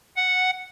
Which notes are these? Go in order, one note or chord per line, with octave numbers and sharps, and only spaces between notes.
F#5